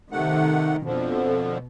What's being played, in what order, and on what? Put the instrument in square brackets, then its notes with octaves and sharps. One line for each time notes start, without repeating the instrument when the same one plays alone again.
[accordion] C3 A3 F#5 [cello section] D#3
[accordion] F2 D3 F3 [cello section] B2